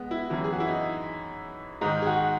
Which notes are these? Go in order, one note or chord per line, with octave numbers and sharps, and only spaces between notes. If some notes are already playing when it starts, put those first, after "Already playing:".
Already playing: G#3 B3
E4
F#2 E3 E4
G#4
F#4
E4
D#4
G#2 D#3 D#4
G#4
F#4